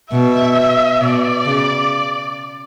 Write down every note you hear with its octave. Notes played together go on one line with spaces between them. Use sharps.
B2 E5
B2 D5
C#3